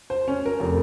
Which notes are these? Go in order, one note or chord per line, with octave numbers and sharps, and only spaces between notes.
C5
C#4
A#4
F1